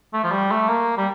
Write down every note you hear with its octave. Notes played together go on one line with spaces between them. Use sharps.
A3
F3
G3
A3
A#3
G3